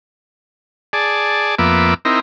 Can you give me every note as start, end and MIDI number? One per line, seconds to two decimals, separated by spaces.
0.93 1.55 68
0.93 1.55 74
0.93 1.55 81
1.59 1.94 41
1.59 1.94 58
1.59 1.94 59
1.59 1.94 76
1.59 1.94 86
2.05 2.20 60
2.05 2.20 63
2.05 2.20 64
2.05 2.20 70